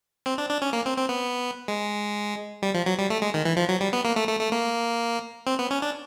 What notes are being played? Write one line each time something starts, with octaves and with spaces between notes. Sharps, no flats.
C4
D4
D4
C#4
A#3
C4
C4
B3
G#3
G3
F3
F#3
G3
A3
G#3
D#3
E3
F3
F#3
G3
B3
A#3
A3
A3
A3
A#3
C4
B3
C#4
D4